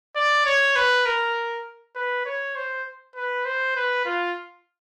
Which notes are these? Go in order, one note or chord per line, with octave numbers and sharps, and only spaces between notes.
D5
C#5
B4
A#4
B4
C#5
C5
B4
C5
B4
F4